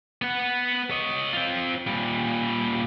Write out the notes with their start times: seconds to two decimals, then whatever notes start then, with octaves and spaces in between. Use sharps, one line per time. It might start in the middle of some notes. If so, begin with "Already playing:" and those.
0.22 B3 F#5
0.91 C#5 D#5
1.33 C4 F4
1.87 A#2 G3